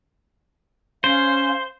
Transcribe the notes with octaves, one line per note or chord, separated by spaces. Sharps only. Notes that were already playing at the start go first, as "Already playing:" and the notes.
C#4 C5 F5